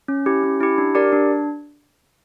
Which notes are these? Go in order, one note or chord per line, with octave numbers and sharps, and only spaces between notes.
C#4
E4 G4
C#4
E4 G4
D4
G4 A#4 D5
D4